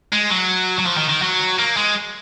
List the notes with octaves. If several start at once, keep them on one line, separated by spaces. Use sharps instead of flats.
G#3
F#3
F#3
F3
D#3
D#3
F#3
A#3
G#3